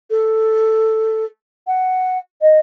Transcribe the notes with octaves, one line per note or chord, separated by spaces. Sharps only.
A4
F#5
D#5